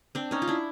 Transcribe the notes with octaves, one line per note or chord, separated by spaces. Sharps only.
C4 D4
C#4 D#4
F4
D4 E4